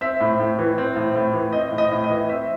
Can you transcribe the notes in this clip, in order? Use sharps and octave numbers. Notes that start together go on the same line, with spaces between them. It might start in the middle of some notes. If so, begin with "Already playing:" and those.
C4 E5
A2
A2
E3
C4
A2
A2
E3
C4 D#5
A2
D#5
A2
D#5
E3
C4 E5